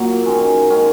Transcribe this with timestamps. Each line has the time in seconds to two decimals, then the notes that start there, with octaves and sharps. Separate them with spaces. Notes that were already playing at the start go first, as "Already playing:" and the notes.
Already playing: A#2 F#3 A#3
0.26 F#2 D#3 G#3 C#4
0.70 D#3 G#3 C#4